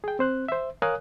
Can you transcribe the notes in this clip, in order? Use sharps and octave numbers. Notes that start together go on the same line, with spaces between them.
G#4 G5
C4 C5 F#6
C5 E5
A#4 C#5 F5 G#5 D#6 F#6